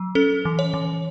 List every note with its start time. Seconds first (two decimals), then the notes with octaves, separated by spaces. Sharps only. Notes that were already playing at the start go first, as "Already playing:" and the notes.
Already playing: F#3
0.15 C#4 A4
0.45 E3
0.59 C#5
0.74 E3